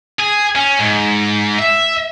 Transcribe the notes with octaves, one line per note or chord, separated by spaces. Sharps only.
G#4
C#4
G#2
E5